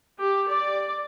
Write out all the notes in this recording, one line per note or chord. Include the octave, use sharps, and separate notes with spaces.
G4
D5